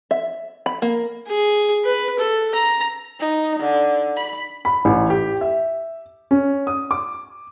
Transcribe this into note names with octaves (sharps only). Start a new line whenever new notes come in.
E5
B5
A#3
G#4
B4
A4
A#5
D#4
D3
B5
B5
A1
G4
E5
C#4
D#6
D6